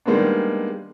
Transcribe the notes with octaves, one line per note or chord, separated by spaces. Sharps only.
D#3 G3 G#3 A#3 B3 D4